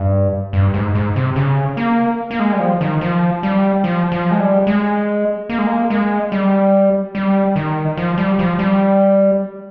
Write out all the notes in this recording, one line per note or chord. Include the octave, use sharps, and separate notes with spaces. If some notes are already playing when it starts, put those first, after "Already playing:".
Already playing: G2
G2
G#2
G#2
C3
C#3
A#3
A#3
G#3
G3
F3
D#3
F3
G3
F3
F3
G#3
G3
G#3
A#3
G#3
A#3
G#3
G3
G3
D#3
F3
G3
F3
G3